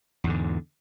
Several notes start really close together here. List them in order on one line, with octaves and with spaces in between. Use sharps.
E2 G#2 D3